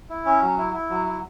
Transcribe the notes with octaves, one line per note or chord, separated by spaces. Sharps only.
E4
C#4
F#3
E4
E4
F#3
E4